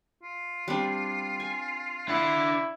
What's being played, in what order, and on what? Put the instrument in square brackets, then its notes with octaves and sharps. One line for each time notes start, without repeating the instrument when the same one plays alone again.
[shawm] F4
[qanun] G3 C4 D4
G#5
[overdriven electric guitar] D4 F#5 [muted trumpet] E4